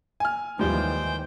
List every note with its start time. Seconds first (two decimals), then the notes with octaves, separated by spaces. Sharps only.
0.20 G#5 F6
0.59 D#2 G#2 E3 F3 G3 C5 G5